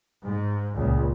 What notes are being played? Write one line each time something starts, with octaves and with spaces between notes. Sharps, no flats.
G#2
C#2 A#2